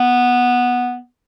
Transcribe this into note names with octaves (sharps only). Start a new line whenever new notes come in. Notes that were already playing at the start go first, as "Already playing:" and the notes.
Already playing: B3